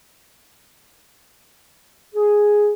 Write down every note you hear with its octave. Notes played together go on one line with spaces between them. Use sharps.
G#4